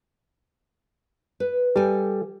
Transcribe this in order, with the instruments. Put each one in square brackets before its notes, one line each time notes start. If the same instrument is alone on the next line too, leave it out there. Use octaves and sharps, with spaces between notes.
[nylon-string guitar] B4
[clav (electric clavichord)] G3 [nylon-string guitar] A4 G#5